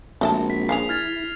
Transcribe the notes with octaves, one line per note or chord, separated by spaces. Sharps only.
A#1 G#3 A3 C4 F#4 D#5 A5
B6
C#3 F3 G#4 C7 F7
E4 F6 G#6 A6